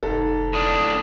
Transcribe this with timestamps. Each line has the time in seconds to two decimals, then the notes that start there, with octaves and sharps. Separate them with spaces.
0.03 F1 G#2 A4
0.53 A2 D4 D#6